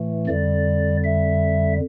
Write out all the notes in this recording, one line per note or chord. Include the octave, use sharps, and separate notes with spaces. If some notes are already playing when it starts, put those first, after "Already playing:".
Already playing: A2 E3 A3
F2 D3 G3 D5
E5